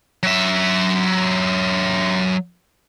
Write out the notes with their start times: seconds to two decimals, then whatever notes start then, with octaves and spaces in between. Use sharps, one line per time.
0.23 F#3 E5